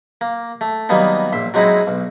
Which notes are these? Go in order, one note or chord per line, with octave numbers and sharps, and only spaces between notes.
A#3
A3
D#3 F#3 G3 A#3 B3 D#4
A#1 E5 C6
F#3 G#3 C4 D#4 E4 F#4
B1